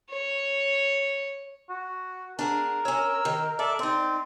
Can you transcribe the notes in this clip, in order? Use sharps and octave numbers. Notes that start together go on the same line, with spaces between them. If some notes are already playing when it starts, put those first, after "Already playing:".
C#5
F#4
D4 G#4 A#4 F#5
C#4 C#5 E6
D#3
A4 D5 E5
C4 D#4 D5